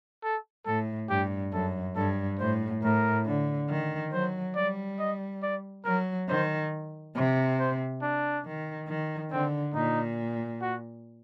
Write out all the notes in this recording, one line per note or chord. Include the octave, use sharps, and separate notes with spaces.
A4
A2 A4
G2 G4
F#2 A4
G2 A4
A2 C5
A2 A#4
D3
D#3
F#3 C5
G3 D5
D#5
D5
F#3 A#4
D#3 C5
C3
C5
D4
D#3
D#3
D3 C4
A#2 D#4
F#4